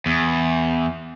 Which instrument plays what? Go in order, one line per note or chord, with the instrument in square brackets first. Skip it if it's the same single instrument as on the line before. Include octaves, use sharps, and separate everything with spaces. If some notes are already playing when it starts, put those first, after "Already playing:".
[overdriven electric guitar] E2